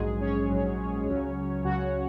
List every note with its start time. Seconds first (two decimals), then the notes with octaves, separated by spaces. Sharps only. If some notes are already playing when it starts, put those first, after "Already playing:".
Already playing: A#1 G#2 F#3 G#3 G#4
0.20 C#4 C#5
0.49 A#1 G#2 F#3
1.06 C#2 C#3 F#3
1.64 C#2 C#3 F#3 F#4 F#5